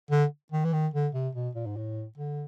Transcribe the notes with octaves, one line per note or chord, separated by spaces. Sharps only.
D3
D#3
E3
D#3
D3
C3
B2
A#2
G#2
A2
D3